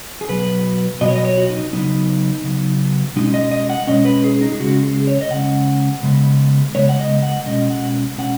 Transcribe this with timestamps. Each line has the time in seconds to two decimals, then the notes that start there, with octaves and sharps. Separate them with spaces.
0.21 G#4
0.29 B2 F#3 B3 B4
1.01 B2 F#3 B3 D#5
1.08 C#5
1.16 D#5
1.25 C#5
1.37 F#4
1.49 D#4
1.73 C#3 F#3 B3 D#4
2.44 C#3 F#3 B3
3.16 B2 G#3 C#4 D#4
3.34 D#5
3.51 D#5
3.69 F#5
3.87 B2 G#3 C#4 D#5
4.05 B4
4.24 G#4
4.41 D#4
4.52 G#4
4.59 C#3 G#3 C#4 F#4
4.83 G#4
5.07 C#5
5.21 D#5
5.31 C#3 G#3 C#4 F#5
6.03 C#3 G#3 B3
6.75 C#3 G#3 B3 C#5
6.89 F#5
6.99 D#5
7.22 F#5
7.46 B2 G#3 C#4 D#5
7.70 F#5
8.17 B2 G#3 C#4 F#5